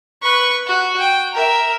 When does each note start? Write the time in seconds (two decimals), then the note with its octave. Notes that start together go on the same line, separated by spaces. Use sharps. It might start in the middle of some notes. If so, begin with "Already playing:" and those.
0.22 B4 C#6
0.67 F#4
0.98 G5
1.33 A#4 E5